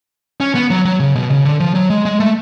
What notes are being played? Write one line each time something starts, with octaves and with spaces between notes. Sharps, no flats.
C#4
B3
F#3
F#3
C#3
B2
C#3
D3
F3
F#3
G#3
G#3
A3